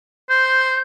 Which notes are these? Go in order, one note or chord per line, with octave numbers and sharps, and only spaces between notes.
C5 G6